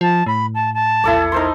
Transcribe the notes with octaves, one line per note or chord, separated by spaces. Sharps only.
F3 A5
A2 B5
A5
A5
A#1 E2 E4 A4 D5
D#4 A#4 C5 C6